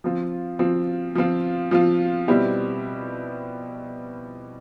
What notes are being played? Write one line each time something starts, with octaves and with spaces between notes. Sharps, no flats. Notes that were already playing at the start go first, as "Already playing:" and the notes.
F3 C4 F4
F3 C4 F4
F3 C4 F4
F3 C4 F4
B2 G3 C4 E4 G4